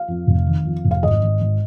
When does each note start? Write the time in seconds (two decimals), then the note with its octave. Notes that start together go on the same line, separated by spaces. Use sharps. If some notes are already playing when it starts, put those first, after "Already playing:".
Already playing: F5
0.08 F2
0.27 F1
0.46 D#3
0.65 F2
0.84 F1
0.91 F5
1.02 G#1 D#5
1.23 G#1
1.41 G#1